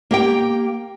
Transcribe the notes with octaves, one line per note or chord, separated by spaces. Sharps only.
A#3 G4 G5